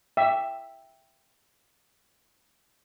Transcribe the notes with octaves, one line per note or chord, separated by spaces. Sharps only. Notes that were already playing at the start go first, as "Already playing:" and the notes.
E5 G5